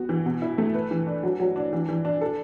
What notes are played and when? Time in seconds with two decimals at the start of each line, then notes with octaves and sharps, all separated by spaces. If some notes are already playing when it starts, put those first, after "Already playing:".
Already playing: B3 F#4
0.09 E3
0.26 B2
0.42 E4
0.58 A3
0.74 B4
0.91 E3
1.07 D4
1.23 F#3
1.40 F#3
1.56 D4
1.73 E3
1.89 E3
2.05 D4
2.21 A4